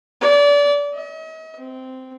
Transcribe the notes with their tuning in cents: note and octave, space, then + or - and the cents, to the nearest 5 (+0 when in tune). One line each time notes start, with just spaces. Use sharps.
D5 -30
D#5 +45
C4 -10